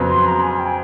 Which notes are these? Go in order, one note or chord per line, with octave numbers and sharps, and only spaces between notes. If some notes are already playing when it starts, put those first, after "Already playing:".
Already playing: F2 C#3 F#3 B3
C6
A#5
G#5
G5